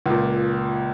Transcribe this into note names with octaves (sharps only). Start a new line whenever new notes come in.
C#2 A#2